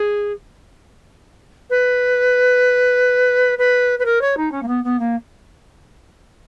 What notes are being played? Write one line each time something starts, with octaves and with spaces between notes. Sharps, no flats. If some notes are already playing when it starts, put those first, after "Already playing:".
Already playing: G#4
B4
B4
B4
A#4
C#5
D#4
C#4
A#3
B3
B3
A#3